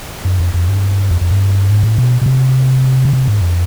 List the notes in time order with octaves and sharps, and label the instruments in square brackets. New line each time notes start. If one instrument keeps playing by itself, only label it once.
[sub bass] F#2
F2
F2
G2
F2
F2
G2
G#2
A2
B2
B2
C3
C#3
C3
G#2
F2